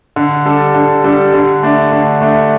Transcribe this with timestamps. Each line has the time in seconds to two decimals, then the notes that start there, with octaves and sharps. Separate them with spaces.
0.16 D3
0.46 G3 D4 A4
0.75 D3
1.04 G3 D4 A4
1.33 D3
1.63 A3 D4
1.92 D3
2.21 A3 D4